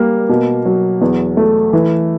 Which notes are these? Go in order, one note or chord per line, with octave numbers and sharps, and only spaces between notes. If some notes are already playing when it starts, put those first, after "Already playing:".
Already playing: G3 A#3
B2
F#3
E2
A3
E3